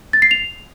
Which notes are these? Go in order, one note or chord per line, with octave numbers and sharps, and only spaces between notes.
A6
C7
F7